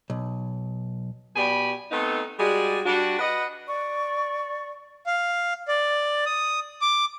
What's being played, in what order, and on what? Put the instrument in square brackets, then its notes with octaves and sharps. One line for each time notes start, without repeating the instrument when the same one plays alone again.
[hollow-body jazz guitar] B1
[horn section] B2 G4 D5 G#5 B5
A3 B3 C4 D#4
G3 G#3 F#4 G#4 D5
G3 D4 F#4
B4 D#5 F#5
[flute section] D5 C#6
[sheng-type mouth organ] F5
D5
D#6
D6